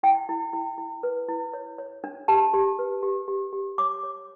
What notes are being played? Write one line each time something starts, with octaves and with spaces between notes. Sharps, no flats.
E4 G5
E4
E4
E4
B4
E4
C#5
C#5
D4
G4 A5
G4
B4
G4
G4
G4
C#5 D6
C#5